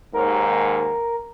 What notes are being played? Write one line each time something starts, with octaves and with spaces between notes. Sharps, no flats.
D#2 G#2 A#4